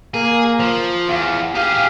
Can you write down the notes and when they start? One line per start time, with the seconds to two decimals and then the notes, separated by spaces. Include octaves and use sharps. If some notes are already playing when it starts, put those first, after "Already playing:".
0.14 A#3 G#4
0.60 F3
1.09 E2 F5
1.55 G4 G#4 F5